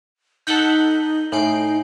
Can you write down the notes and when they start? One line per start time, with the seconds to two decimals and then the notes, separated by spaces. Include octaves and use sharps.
0.47 D#4 A4 F#5 G6 B6 F#7 G7
1.32 A2 D#4 G#5 C7 D7 F#7